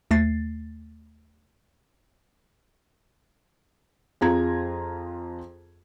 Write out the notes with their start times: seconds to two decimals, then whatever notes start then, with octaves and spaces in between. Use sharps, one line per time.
0.11 D#2 A3 A6 C7
4.21 F2 F4 G#4 A#5 G#6